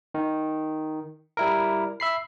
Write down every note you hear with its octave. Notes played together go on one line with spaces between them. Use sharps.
D#3
G3 E4 A#4
E5 B5 C7